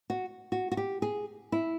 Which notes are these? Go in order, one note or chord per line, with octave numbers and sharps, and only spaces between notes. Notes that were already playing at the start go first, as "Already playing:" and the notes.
F#4
F#4
F#4
G4
G#4
E4